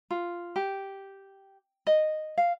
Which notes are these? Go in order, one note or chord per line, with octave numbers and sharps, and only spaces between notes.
F4
G4
D#5
F5